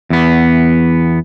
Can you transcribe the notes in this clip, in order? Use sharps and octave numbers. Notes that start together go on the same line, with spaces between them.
E2 B3